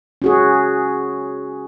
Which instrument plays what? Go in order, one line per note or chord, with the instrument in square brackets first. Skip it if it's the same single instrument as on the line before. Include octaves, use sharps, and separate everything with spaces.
[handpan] C#4 F#4 G#4